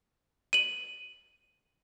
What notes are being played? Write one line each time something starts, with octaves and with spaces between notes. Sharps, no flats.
D#7 F#7